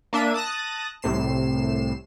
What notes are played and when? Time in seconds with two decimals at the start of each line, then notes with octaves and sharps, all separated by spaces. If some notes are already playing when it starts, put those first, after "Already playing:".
0.13 A#3 D4 E5 D#7
0.34 A5 D#6 F#6 A#6
1.02 C2 A2 C3 C7 E7